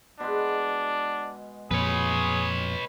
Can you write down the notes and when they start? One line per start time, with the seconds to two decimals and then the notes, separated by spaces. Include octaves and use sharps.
0.20 B2 G#3 D4
1.71 F2 A#2 G#4 B4 C#5 B5